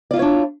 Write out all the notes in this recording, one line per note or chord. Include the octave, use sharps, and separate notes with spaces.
D4 E4 F4 C#5 D5